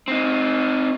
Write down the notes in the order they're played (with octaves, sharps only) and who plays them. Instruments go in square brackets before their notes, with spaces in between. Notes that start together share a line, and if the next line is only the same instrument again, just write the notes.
[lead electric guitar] C4 D#4